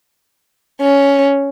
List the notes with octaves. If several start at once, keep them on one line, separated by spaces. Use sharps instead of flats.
C#4